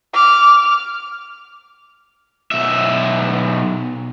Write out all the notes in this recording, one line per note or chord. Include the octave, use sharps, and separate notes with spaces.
D6 F6
B1 E5